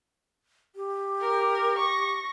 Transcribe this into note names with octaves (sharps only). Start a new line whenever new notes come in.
G4
A#4
C#6 A#6